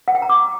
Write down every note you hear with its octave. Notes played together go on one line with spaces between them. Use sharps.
F#5
G5
A#5
D6